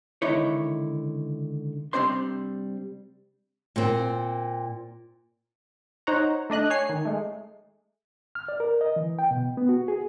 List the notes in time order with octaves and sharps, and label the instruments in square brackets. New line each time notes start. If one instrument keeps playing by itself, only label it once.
[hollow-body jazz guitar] C#2 D3 D#3 D#4 E4 C#5
C3 G3 C4 D4 C5 C6
[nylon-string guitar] A#2 C4
[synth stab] D#4 C5 C#5 F#5 A#5
A3 D4 D#5 F#6
C#5 G#5 C7
D#3
G#3 A3
[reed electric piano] F6
D5
A#4
D#5
E3
G5
B2
B3
F#4
G#4